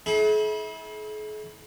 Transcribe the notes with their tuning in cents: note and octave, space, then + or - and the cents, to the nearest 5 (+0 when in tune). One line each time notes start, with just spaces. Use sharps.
E4 -35 G#4 +45